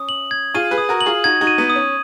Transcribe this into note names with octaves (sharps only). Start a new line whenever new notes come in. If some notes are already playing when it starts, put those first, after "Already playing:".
Already playing: C#4 D#6
F#7
G#6
F4 G#4 D#7
G#4 B4
D#6
F#4 A#4
F#7
F4 G#4
D#4 F#4 G#6
D#4 F#4
D#7
B3 D#4
D#6
C#4